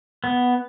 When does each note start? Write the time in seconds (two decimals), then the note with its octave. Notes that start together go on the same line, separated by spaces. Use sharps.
0.24 B3